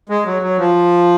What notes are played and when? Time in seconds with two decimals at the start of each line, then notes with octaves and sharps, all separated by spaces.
0.09 G#3
0.26 F#3
0.43 F#3
0.58 F3